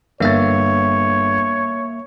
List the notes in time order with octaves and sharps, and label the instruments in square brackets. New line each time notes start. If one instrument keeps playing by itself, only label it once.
[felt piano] G1 A6 [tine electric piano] A#3 E5 [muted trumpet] C#5